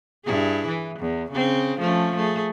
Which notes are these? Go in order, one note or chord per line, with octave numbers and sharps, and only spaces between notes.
G2 E4 G#4
E3
E2
C#3 C4
F3 A3 C#4
A3 G#4